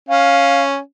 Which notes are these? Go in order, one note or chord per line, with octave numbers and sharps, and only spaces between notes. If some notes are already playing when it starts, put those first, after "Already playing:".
C#4 F5